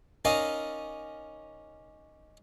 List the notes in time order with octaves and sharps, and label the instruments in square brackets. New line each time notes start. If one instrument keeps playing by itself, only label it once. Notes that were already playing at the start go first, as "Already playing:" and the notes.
[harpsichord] C#4 D#4 A#4 D5 D#5 F5